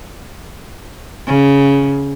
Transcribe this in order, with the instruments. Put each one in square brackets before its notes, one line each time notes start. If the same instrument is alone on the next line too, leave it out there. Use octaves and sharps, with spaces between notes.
[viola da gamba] C#3